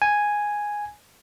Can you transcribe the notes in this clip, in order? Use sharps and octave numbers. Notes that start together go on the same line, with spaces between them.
G#5